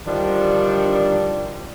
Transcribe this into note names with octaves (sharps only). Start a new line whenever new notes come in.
D3 D#3 F3 G3 D4